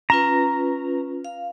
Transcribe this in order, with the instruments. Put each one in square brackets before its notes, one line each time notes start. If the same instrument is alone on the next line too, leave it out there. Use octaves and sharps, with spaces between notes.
[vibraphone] C#4 F4 B4 [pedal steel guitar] A#5
[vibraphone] F5